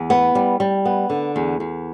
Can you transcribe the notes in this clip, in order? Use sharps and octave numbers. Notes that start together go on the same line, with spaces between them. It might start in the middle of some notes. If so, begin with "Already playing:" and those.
Already playing: E2
B3
G3
G3
B3
D3
E2
E2